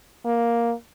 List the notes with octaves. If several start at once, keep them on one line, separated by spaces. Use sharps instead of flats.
A#3